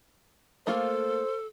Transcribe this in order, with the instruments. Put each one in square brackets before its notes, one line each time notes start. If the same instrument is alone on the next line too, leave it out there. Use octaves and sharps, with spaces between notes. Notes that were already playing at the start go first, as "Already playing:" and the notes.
[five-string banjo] A3 A#3 F4 [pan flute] A4 [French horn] C5